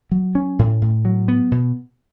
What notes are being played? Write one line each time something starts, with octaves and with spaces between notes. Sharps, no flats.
F#3
C#4
A2
A2
F#3
B3
B2